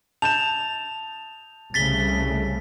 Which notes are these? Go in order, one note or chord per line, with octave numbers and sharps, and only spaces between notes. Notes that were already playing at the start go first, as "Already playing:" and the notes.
A5 G6 E7 F7
C2 C#3 A3 A6 B6 G7